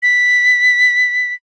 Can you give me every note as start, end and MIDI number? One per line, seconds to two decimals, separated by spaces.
0.03 1.33 95